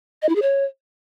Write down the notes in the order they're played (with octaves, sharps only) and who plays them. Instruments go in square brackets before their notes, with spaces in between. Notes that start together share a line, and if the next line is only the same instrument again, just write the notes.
[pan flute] D#5
E4
G#4
C#5